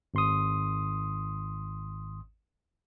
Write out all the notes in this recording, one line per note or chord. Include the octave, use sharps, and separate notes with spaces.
G#1 C6 D#6